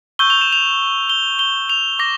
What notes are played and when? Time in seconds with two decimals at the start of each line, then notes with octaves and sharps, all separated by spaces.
0.19 C#6 E6 G6 G7
0.30 F7
0.41 E7
0.53 F7
1.09 G7
1.39 G7
1.69 F7
1.99 D6 A#6